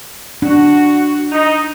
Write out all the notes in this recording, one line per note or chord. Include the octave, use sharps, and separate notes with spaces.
D4 F#4
D#4